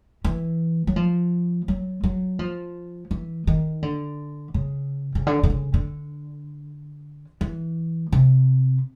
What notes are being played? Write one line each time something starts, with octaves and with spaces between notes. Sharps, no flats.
E3
F#3
F3
F#3
F#3
F3
E3
D#3
D3
C#3
C#3
D3
D3
C#3
D3
E3
C3